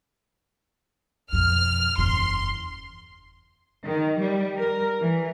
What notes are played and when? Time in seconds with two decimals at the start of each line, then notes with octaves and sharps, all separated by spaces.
1.33 F2 B2 F6
1.98 F#1 E2 C6
3.85 D#3
4.19 G3
4.58 A#4
5.00 E3